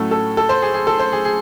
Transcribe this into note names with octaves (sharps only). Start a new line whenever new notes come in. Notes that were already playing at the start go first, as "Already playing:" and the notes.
Already playing: A2 F#3 A3 C#4 A4
A4
A4
C5
G#4
G#4
A4
C5
G#4
G#4